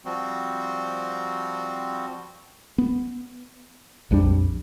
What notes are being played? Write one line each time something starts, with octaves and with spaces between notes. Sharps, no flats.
F3 G3 C4 F#4
B3
A#1 F2 G3 D4